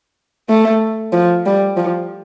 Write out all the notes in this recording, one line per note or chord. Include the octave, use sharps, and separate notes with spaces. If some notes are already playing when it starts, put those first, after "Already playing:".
A3
F3
G3
F3